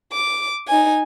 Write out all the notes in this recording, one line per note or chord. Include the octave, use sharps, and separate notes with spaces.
D6
D#4 G#5